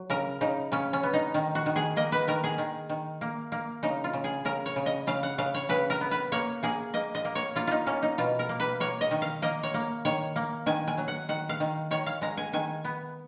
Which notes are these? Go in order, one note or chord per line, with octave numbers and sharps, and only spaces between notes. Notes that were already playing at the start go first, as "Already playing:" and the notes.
Already playing: F#3
C#3 A#4
C#3 D#4
C#3 C#4
C#4
B3
D#4
D#3
F#4
D#3
G#4
A#3 D#5
B4
D#3 A#4
G#4
D#3
D#3
A#3
A#3
C#3 D#4
F4
C#3
G#4
C#3 A#4
C#5
C#3
D#5
C#3 F5
F#5
C#3 F5
C#5
C#3 B4
A#4
B3
B4
A#3 C#5
A#3 G#4
A#3 D#5
D#5
A#3
C#5
A#3 F4
D#4 F4
A#3 C#4
D#4
B2 F4
A#4
A#3
B4
A#3 C#5
D#5
D#3
F5
A#3 D#5
C#5
A#3
D#3 C#5
A#3
D#3 G#5
G#5
F#3
F#5
D#3 F#5
F5
D#3
D#3 C#5
F5
G#3 A#5
G#5
D#3 G#5
B3